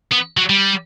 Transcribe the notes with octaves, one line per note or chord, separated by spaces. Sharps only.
B3
F#3
G3